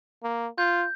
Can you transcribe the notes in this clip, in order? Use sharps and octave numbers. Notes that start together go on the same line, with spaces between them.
A#3
F4 G6